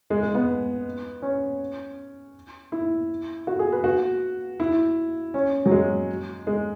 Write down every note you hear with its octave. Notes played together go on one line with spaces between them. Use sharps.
G#3
G#3
B3
C#4
E4
F#4
G#4
B4
F#4
E4
C#4
F#3
G#3
G#3